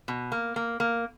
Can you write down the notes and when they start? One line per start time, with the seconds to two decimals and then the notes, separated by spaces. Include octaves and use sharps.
0.08 B2
0.32 A#3
0.56 A#3
0.80 A#3